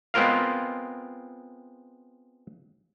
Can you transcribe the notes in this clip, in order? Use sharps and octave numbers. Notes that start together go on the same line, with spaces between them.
G#3 B3 C4 F4 A#4 F5